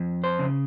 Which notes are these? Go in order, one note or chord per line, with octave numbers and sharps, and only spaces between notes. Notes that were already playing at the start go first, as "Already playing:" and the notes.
Already playing: F2
C5
C#3